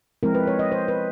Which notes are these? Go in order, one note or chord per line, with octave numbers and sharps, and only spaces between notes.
F3 G#3 C4 E4 A#4
B4
C#5
D#5
C5
B4